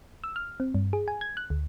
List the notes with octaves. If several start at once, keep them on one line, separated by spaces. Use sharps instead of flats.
E6
F6
C4
G2
G#4
G#5
G#6
F#6
D2